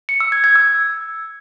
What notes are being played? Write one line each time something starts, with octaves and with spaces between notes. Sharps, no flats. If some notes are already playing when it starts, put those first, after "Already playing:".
C#7
E6
G#6
G#6
E6